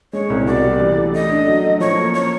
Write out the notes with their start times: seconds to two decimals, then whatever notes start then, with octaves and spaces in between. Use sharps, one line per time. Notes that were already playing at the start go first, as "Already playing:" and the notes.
0.13 G#3 C#5
0.30 C2
0.47 B2 D5
0.63 G3
0.80 E3
0.96 A3
1.13 A3 D#5
1.30 D4
1.47 F#3
1.64 A3
1.80 F3 C#5
1.97 A#3
2.14 A#3 C#5